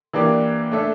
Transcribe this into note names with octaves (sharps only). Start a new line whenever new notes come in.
E3 A#3 D4 G4 D5
A3 D4 A4 E5